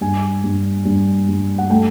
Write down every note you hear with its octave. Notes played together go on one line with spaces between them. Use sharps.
G2 G#5
G2
G2
G2
F#5
A3 G5